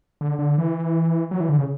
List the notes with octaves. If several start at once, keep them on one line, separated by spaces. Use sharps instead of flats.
D3
D3
E3
F#3
E3
D3
C#3